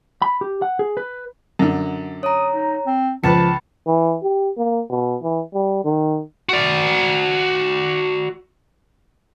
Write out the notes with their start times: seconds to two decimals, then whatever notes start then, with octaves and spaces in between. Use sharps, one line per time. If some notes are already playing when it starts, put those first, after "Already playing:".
0.22 B5
0.41 G4
0.62 F#5
0.79 G#4
0.97 B4
1.59 F#2 D3
2.23 C#5 A#5 D#6
2.54 D#4
2.86 C4
3.24 C#2 F3 B4 A5 B5 A6 C#7
3.86 E3
4.22 G4
4.57 A#3
4.90 B2
5.22 E3
5.54 G3
5.85 D#3
6.49 F#4 D5